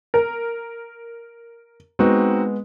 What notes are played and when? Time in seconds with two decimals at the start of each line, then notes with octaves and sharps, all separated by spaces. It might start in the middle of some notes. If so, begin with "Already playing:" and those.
0.14 A#4
1.99 G#3 B3 C4 D#4 F#4